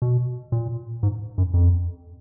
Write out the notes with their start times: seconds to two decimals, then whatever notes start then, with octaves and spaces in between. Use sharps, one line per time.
0.02 B2
0.52 A#2
1.03 G#2
1.38 F#2
1.54 F2